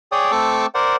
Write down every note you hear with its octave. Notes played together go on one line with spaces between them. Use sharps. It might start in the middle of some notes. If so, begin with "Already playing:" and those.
G#4 C#5 D5 G5 D#6
A3 C4 A5 C#6 D6 E6
A#4 C5 D5 F#5